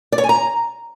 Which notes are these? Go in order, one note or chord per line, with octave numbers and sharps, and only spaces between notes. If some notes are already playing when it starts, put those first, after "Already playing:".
D5
C#5
G#5
A#5